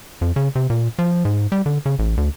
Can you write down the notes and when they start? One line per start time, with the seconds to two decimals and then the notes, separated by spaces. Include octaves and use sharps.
0.21 F2
0.36 C#3
0.55 C3
0.70 A#2
0.99 F3
1.25 G#2
1.52 G3
1.66 D3
1.86 C#3
1.99 A1
2.17 D2